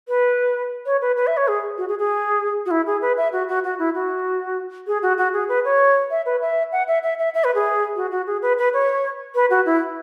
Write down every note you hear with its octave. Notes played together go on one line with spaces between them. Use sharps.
B4
C#5
B4
B4
E5
C#5
G#4
F#4
G#4
G#4
F#4
E4
G#4
B4
E5
F#4
F#4
F#4
E4
F#4
G#4
F#4
F#4
G#4
B4
C#5
E5
B4
E5
F#5
E5
E5
E5
E5
B4
G#4
F#4
F#4
G#4
B4
B4
C#5
B4
F#4
E4